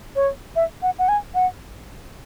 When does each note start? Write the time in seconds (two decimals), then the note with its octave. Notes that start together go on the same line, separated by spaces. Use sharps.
0.16 C#5
0.56 E5
0.82 F#5
0.99 F#5
1.09 G#5
1.35 F#5